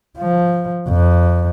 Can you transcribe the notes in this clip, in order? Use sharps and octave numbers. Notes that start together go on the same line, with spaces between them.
F3
F2